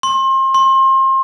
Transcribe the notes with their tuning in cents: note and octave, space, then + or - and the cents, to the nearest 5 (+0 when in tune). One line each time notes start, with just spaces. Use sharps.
C6 +35
C6 +35